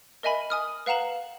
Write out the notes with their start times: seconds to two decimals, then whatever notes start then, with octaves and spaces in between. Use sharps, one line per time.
0.23 A#4 D#5 E5 G#5 B5
0.50 G#5 D#6 F6
0.86 B4 F5 F#5 A#5 E7 F#7